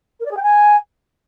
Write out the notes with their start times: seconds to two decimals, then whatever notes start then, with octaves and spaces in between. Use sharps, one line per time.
0.19 A#4
0.25 D5
0.31 G#4
0.36 G5
0.42 G#5